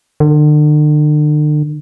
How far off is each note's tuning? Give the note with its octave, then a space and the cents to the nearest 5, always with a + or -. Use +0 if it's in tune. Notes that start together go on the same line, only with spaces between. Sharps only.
D3 +40